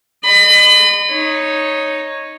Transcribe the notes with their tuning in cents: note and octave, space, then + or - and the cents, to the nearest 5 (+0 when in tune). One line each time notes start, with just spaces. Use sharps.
D#5 -30 B5 +30
D#4 +0 C#5 -10